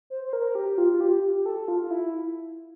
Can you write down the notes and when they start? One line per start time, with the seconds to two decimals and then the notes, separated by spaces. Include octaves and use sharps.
0.10 C5
0.24 C5
0.33 A#4
0.55 G4
0.78 F4
1.01 G4
1.23 G4
1.46 A4
1.68 F4
1.90 E4